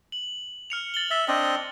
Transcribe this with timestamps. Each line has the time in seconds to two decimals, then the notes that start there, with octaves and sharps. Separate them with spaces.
0.12 F#7
0.70 F6 C#7 F7
0.94 A6 F#7 G7
1.11 E5 A6 G7
1.28 C4 D4 D#5